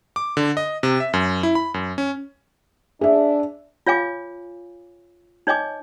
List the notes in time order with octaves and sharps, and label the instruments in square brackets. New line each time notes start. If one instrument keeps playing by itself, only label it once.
[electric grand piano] D6
D3
D#5
C3
E5
F#2
E4
B5
F#2
C#4
[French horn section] D4 [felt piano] G#4 E5
[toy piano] F4 C#5 F5 G#5 D6
D#4 C#5 D#5 G#5 D6